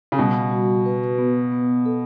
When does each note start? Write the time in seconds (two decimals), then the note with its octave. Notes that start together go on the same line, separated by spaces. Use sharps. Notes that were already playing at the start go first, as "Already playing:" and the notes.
0.12 C#3
0.18 B2 G3
0.51 F#4
0.86 B4
1.18 B3
1.52 B3
1.86 A4